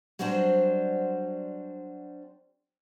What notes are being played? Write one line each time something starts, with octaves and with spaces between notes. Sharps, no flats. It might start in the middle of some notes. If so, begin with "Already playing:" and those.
F#3 G3 C4 D4 F#4 C5